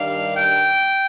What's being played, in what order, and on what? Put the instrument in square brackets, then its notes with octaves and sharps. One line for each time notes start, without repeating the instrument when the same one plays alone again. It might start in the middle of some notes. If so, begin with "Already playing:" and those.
Already playing: [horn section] G2 D#3 G3 D4 F5
G5